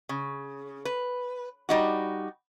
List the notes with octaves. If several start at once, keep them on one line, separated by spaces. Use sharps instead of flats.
C#3
B4
G3 D#4 F#4